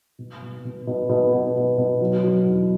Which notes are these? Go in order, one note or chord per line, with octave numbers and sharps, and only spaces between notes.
B2
B2
B2
B2
B2
B2
B2
B2
F#3
F#3
E2